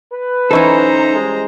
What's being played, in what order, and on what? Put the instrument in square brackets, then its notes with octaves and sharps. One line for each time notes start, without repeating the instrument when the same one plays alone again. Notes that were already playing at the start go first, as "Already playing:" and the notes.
[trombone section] B4
[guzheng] E3 C#4 E4 [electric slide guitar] D#4 A4 [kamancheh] C5 A#5
[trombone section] G3 G#3